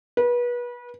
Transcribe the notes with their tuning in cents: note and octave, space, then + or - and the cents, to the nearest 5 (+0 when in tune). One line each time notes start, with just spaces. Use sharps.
B4 -30